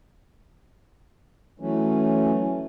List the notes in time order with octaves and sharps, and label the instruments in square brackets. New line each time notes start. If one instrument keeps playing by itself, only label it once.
[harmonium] E3 F#3 A3 C#4